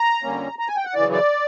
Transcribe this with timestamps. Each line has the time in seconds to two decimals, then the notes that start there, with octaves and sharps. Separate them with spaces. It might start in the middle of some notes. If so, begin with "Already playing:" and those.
Already playing: A#5
0.23 F2 D3 G3 A#3 C#4
0.59 A#5
0.68 G#5
0.76 G5
0.85 F#5
0.94 F#2 C#3 E3 D5
1.12 D5